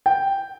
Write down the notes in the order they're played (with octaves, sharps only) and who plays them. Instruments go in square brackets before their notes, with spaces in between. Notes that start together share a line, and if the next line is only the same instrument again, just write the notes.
[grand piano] G5